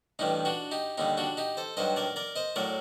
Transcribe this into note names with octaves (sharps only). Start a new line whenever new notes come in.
A1 G2 D#3 G3 D#4
D4 F#4
D#4 G4
D#2 D3 G3 D#4
D4 F#4
D#4 G4
A4 C5
G2 D#3 F#3 C5 D#5
A#4 D5
A#4 D5
C5 D#5
A2 F#3 A#4 D5